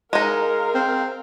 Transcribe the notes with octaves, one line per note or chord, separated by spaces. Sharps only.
G#3 D#4 A#4 F5
C4